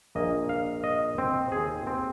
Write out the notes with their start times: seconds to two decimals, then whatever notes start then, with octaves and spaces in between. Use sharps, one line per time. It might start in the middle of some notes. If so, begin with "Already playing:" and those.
0.15 A#1 A#2 A#3 D#5
0.49 F5
0.84 D#5
1.18 C4
1.52 D#2 D#3 C4 G#4
1.87 C4